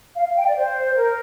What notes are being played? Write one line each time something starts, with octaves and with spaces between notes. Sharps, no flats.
F5
F5
G5
D5
C5
A#4